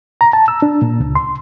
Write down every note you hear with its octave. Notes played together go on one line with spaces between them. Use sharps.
A#5
A5
E6
D4
A#2
C#2
C6